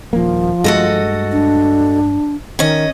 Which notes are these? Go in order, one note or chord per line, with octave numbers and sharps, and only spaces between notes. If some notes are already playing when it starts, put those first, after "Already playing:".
D#1 F3 A#3
G2 G#3 A3 F#4 A4 D#5
D4
D#3 C#4 D#5